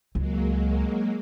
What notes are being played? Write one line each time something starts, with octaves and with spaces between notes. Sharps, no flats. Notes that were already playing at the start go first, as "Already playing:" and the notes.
C#2 F#3 G#3 A#3